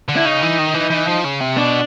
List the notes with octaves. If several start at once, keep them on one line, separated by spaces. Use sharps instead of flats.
D3
E4
C#3 D#4
E3
D#3
E3
E3
F3
C#3
C3
B2 D4